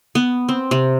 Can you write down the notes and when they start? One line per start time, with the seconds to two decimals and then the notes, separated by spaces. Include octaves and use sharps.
0.15 B3
0.49 C4
0.71 C3